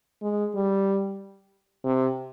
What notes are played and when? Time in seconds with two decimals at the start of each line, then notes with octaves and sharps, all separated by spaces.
0.22 G#3
0.55 G3
1.84 C3